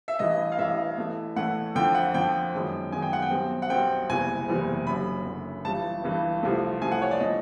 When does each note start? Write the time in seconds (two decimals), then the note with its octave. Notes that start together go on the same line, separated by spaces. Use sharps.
0.08 E5
0.19 A1 G2 E3 D#5
0.52 F5
0.59 A1 G2 E3 E5
0.97 A2 E3 A3
1.36 A2 E3 A3 F#5
1.75 F2 D3 F3 G5
1.95 F#5
2.14 F2 D3 F3 G5
2.53 F#2 D#3 G#3 B3
2.92 F#2 D#3 G#3 B3 G#5
3.02 G5
3.13 F#5
3.22 G5
3.31 B1 B2 G3 C4
3.62 F#5
3.70 B1 B2 G3 C4 G5
4.09 F#1 E2 C3 E3 G3 G#5
4.48 F#1 E2 C3 E3 G3
4.87 F#1 F#2 D3 B5
5.25 F#1 F#2 D3
5.65 G1 G2 E3 G3 A5
6.04 G1 G2 E3 G3
6.43 C2 C3 F3 A3
6.81 C2 C3 F3 A3 G#5
6.91 F#5
7.02 C#5
7.11 D5
7.20 A2 F3 A3 D4 D#5